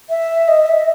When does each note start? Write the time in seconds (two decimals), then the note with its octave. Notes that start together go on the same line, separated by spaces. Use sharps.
0.10 E5
0.48 D#5
0.66 E5